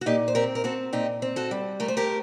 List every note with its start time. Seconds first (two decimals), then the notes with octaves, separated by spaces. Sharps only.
0.01 F#4
0.06 A#2 D#4 G4
0.28 C5
0.35 C4 G4 A#4
0.55 A#4
0.64 C4 F#4 A4
0.93 A#2 D#4 G4
1.22 C4
1.36 F#4 A4
1.51 G3
1.80 A3 A#4
1.88 C5
1.97 G4 A#4